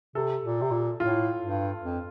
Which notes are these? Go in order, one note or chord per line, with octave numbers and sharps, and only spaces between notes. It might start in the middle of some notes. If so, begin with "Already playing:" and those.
C3 A4
A#2
C3
A#2
A2 F4
G2
F2